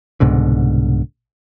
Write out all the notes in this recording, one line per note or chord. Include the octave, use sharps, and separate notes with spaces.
C2 G#2 B2 D3